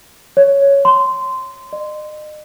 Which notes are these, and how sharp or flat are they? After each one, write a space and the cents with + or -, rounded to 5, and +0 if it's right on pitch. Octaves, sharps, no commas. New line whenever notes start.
C#5 +5
C6 -15
D#5 -40